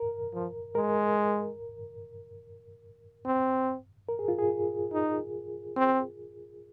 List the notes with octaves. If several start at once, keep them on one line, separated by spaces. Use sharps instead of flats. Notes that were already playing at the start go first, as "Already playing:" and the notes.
Already playing: A#4
F3
G#3 A#4
C4
A#4
G#4
F4
G#4
D#4
C4